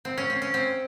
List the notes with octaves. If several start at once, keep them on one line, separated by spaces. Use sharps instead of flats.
C4
C#4
C4
C#4
C4